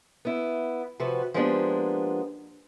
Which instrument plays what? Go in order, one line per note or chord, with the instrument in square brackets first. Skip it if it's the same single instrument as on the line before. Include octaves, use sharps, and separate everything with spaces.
[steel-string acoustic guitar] B3 E4
C3 F3 F#4 B4
F3 G#3 A#3 B3 D4 G4